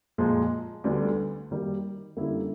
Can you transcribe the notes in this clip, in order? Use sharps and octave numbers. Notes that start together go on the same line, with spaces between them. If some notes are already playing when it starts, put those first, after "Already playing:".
A#2 F3 G#3
D2 D3 G3 B3 D4
D#3 G3 A#3
D3 G3 A#3 C#4 E4